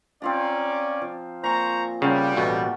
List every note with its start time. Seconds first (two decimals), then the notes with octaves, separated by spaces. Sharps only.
0.22 C4 C#4 F4 D5 A#5
1.02 F3
1.43 A#2 C5 A#5 C#6
2.02 C#3 G3 F4 A#4 F#5
2.37 A1 B2 A3 F#4 C#5